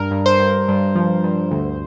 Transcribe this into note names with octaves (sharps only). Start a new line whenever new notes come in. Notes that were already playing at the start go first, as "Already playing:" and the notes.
Already playing: G2 A#4
G2
C5
G2
G2
F3
G2
D2